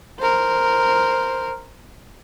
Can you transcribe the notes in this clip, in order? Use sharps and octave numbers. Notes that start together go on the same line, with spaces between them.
A#4 C5